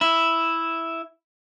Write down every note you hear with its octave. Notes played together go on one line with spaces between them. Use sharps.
E4